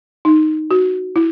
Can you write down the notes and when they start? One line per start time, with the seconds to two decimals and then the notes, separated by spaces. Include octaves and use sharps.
0.25 D#4
0.71 F#4
1.16 E4